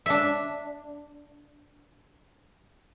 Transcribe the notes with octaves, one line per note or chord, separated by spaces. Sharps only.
D4 E5